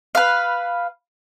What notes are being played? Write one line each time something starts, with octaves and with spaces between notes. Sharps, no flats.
B4 F5